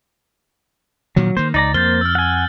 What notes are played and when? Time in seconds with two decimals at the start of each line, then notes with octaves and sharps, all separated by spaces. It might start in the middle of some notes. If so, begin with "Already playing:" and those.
1.16 A#2 D#3 F3 F#3
1.37 D#3 A#3 C5
1.54 C#2 D#4 D5 A#5 A6
1.74 F2 A#3 C5 F6 G6 A6 G7
2.01 E6 F6
2.15 F#5 G#5